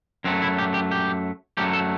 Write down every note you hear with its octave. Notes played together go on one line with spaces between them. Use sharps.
F#2 F#3 A3 C4
E4
G4
G4
G4
F#2 F#3 A3 G4
A4